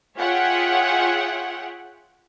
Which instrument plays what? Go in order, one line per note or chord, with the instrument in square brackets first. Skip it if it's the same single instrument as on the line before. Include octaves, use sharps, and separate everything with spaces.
[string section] F4 G#4 C#5 E5 F#5 G5